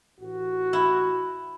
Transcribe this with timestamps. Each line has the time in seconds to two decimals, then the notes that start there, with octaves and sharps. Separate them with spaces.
0.19 A1 F#4
0.73 E4